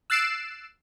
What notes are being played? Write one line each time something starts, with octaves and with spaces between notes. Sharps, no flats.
E6 F#6 A6 C7 D7 E7